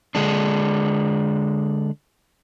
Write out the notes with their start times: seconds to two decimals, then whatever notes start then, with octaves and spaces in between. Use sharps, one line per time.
0.15 D3 G#3 D4